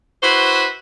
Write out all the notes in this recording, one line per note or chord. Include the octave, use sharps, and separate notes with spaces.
E4 F#4 B4 C5